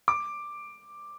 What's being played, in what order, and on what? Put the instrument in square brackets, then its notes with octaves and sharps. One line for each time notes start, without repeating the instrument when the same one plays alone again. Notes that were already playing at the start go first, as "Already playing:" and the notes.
[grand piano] D6